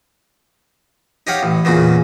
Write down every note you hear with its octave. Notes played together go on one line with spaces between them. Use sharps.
D#4 G4 C#5 F5 F#5
A1
E2 A#2 C#3 F#4